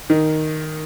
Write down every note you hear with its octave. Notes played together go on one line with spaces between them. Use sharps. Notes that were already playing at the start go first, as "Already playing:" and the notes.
D#3